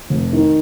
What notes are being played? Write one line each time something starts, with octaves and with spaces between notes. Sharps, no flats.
F1
D#3